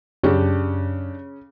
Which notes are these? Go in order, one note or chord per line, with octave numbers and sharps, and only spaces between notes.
F#2 C#3 D4 G4